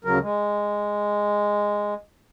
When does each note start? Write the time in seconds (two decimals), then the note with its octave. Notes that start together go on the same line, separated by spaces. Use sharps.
0.05 D2 C#3 F#3 A#4
0.21 G#3